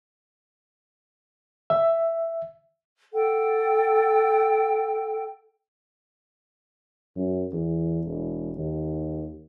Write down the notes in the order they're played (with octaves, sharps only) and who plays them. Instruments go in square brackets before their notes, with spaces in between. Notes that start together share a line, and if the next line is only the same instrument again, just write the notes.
[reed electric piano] E5
[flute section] A4 F#5 G5
[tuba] F#2
E2
E1
D#2